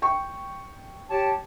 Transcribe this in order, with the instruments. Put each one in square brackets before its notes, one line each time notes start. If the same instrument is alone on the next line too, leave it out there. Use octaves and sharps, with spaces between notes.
[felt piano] G5 C#6
[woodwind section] G4 C#5 A5